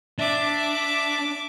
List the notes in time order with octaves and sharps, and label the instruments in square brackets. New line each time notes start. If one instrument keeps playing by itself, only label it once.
[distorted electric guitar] D4 [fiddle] E5 D6